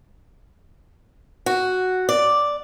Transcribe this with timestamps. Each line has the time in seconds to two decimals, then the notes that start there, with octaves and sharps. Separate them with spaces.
1.46 F#4
2.09 D5